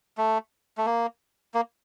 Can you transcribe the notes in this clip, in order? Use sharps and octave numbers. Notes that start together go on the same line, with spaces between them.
A3
A3
A#3
A#3